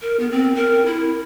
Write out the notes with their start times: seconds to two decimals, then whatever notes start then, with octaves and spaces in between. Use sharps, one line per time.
0.01 A#4
0.20 B3
0.31 C4
0.55 A#4
0.86 E4